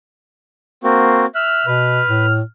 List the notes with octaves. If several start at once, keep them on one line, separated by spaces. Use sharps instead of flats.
A#3 C4 F#4
E5 F6 F#6
B2 B4
A2